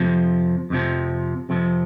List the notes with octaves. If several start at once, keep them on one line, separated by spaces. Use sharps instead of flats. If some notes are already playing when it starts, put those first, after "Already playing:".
Already playing: F2 C3 F3
F2 C3 F3
F2 C3 F3